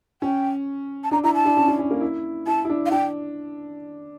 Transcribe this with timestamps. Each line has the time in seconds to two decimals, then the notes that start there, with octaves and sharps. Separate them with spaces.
0.22 C#4 G5
1.04 A5
1.11 D4 A#5
1.24 E4 A#5
1.34 A5
1.45 D4
1.57 C#4
1.68 D4
1.79 C#4
1.91 A#3
2.01 E4
2.47 E4 A5
2.65 E4
2.69 D4
2.86 F5
2.91 D4 G5